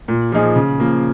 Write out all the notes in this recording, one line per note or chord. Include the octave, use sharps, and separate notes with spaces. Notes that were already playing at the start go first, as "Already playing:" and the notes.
A#2
F3 A#3 D#4 G#4
C#3
F3 A#3